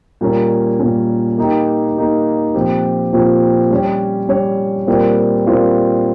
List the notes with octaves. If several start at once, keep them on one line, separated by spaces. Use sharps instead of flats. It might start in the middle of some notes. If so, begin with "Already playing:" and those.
A#2 G3 A#3 C#4
A#2 G3 A#3 C#4
A#3 D#4 G4
A#3 D#4 G4
A#2 F3 C4 G4
A#2 F3 C4 G4
G3 C#4 G4 C#5
G3 C#4 G4 C#5
A#2 G3 C4 F4 A#4
A#2 G3 C4 F4 A#4